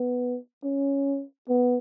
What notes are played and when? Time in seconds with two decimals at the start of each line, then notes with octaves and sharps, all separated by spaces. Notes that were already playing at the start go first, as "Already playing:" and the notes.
Already playing: B3
0.64 C#4
1.49 B3